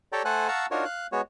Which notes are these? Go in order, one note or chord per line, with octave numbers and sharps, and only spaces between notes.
G4 A4 C#5 D5 G5 A#5
A3 A4 C5 F#5 G#5 F#6
F5 F#5 A5 A#5 C#6 E6
D4 D#4 F4 F#4 A#4 C#5
F5 F#6
G#3 B3 F#4 C#5